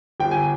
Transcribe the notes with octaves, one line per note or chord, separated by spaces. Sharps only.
G1 G5
G#5